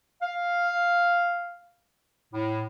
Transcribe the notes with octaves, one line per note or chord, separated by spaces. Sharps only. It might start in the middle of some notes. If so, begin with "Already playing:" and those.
F5
A2